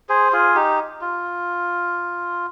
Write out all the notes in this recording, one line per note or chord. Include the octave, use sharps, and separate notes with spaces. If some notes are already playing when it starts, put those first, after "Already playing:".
G#4 C5
F4 G#4
D#4 G4
F4